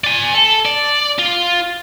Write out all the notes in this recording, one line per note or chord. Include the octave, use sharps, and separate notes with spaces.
D5 G#5
A4
D5
F4